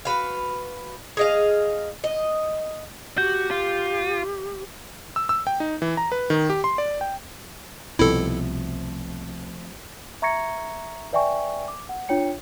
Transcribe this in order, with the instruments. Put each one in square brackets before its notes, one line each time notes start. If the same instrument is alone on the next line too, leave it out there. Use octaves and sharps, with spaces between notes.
[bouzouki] F#4 B4 F5
G#4 D#5 F5
D#5
[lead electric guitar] F#4 [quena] G4 [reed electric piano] G6
[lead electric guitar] F4
[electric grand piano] E6
E6
G5
D#4
E3
A#5
B4
D#3
G4
C6
D5
G5
[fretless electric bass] C2 B2 [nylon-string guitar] F3 A3 C4 [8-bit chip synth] E4 A4
[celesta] E5 A#5 C#6 G#6 A#6 C#7
B4 D5 E5 G5 G#5 C#6
D6
F#5
D4 F4 C#5 G5 C#7